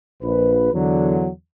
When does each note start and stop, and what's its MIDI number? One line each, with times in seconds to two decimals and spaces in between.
0.23 0.72 34
0.23 0.72 71
0.73 1.29 40
0.73 1.29 50
0.73 1.29 54